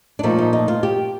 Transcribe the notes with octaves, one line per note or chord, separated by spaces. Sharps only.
D4
A#2 F3 A3 D#4
D#4
D#4
F4
G4